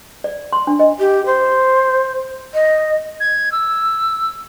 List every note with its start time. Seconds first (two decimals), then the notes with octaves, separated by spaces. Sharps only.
0.24 D5
0.53 C6
0.67 D4
0.80 D#5
0.99 G4
1.26 C5
2.54 D#5
3.20 G#6
3.52 E6